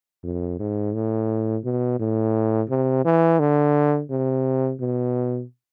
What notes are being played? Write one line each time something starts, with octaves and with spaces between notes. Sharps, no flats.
F2
G#2
A2
B2
A2
C3
E3
D3
C3
B2